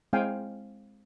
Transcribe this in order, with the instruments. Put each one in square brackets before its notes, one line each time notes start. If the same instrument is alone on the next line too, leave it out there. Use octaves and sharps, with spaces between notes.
[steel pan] G#3 C4 E4 F5 G5 G#5